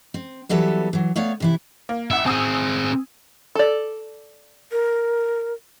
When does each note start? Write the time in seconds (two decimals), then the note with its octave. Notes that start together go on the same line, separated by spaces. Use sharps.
0.14 C4
0.49 E3 F#3 G3 B3 A4 E5
0.93 E3 F#3
1.16 A3 B3 C#5 D5 F5
1.40 C3 E3 E4
1.89 A#3
2.11 A1 E5 F#5
2.26 C4 G#4 G#5 D#6 E6
3.55 A4 D5
4.72 A#4